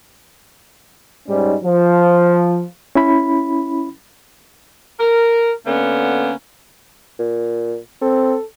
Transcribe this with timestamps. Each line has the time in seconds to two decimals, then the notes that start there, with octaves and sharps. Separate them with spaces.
1.28 G#2 G3 C#4 D#4
1.63 F3
2.95 C#4 E4 B5
5.00 A#4
5.66 D3 A#3 B3 C#4
7.19 A#2
8.02 C4 A4